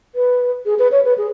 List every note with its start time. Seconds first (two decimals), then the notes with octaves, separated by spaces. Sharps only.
0.15 B4
0.66 G#4
0.79 B4
0.92 C#5
1.05 B4
1.18 G#4